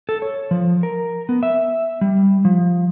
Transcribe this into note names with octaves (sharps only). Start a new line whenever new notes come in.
A4
C#5
F3
A#4
B3
E5
G3
F3